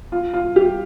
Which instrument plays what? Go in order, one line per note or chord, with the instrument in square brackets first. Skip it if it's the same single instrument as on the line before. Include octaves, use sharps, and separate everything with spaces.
[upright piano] F4
F4
G4